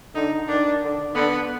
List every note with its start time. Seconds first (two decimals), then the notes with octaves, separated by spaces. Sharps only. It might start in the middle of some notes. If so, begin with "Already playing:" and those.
0.14 D3 D#4
0.48 D#3 D4
0.81 D3
1.14 D3 B3